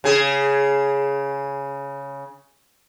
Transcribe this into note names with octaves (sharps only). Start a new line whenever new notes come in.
C#3 G#4